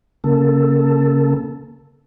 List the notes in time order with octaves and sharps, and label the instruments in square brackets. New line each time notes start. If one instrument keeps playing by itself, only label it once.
[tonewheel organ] C#3 A#3 A4